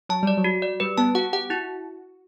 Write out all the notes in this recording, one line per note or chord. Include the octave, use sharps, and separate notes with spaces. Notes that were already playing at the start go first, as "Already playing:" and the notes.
F#3 A5
G3 D5
F#3
F#4
D5
G3 B4
B3 A5
F#4 F#5
G4 F#5
E4 F#4